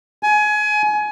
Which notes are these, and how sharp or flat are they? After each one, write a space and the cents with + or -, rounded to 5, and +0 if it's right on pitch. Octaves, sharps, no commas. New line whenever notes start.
G#5 +25